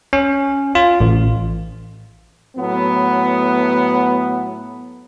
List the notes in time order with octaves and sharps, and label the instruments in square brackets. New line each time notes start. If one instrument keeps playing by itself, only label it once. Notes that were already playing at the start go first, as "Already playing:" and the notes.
[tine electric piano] C#4
F4
A1
[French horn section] A2 F#3 B3